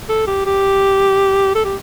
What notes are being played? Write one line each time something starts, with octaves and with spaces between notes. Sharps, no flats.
A4
G4
G4
A4
G4